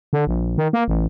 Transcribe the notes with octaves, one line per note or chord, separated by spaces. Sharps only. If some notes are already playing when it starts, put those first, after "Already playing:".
D3
A#1
D#3
A#3
A1